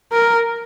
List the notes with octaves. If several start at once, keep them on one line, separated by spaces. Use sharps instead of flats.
A#4